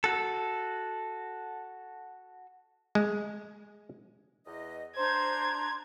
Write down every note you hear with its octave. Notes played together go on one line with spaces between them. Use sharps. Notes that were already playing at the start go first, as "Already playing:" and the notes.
F#4 A4
G#3
E2 D#5
D4 C5 A#5 C6 G#6